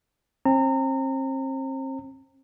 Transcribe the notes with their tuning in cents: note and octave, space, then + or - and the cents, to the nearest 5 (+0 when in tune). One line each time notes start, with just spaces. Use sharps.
C4 +35 A#5 -35